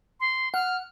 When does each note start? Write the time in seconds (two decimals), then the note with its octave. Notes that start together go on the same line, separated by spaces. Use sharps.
0.20 C6
0.54 F#5 F6